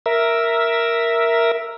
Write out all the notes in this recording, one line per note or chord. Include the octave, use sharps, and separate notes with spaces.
A#4 E5